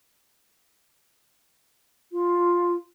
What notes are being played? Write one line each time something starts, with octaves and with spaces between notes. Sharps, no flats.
F4